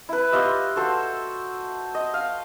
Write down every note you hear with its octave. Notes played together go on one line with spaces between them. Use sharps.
E4 B4
F4 G4 D#5 E5
F#4 A4 C5
D#5
F5